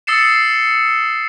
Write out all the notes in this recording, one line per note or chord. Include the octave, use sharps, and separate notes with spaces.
D#6 E6 A6 C7 C#7 E7